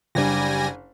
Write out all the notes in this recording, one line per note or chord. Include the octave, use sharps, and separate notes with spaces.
F#1 G3 D4 G#5 A#6